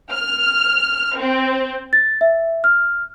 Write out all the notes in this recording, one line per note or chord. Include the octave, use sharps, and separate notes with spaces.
F6
C4
A6
E5
F6